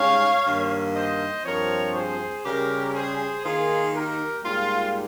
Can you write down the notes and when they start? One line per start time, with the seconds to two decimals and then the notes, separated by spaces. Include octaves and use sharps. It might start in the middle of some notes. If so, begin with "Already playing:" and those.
Already playing: G#2 G3 C#4 C#5 F5
0.46 G2 D#3 A#3
0.96 C5 D#5
1.45 G2 F3 C4 A#4 C#5
1.95 G#4 C5
2.45 C#3 G3 C#4 G4 A#4
2.94 G#4 C5
3.44 D#3 A#3 D#4 F4 G#4
3.94 G4 A#4
4.44 G#2 G3 A#3 F4